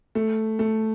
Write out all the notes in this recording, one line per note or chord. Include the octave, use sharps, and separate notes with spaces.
A3
A3